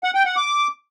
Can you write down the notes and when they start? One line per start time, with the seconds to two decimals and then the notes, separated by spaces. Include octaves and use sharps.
0.04 F#5
0.15 G5
0.25 F#5
0.36 D6